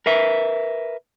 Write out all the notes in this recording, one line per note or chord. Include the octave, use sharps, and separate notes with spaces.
A#4 B4 E5